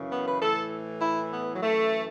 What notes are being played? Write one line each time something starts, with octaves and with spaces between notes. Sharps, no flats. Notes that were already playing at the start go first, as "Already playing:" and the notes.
Already playing: F#2 C#3 E3
B3
B4
A2 E3 A4
E4
B3
F#3
F#2 E3 A3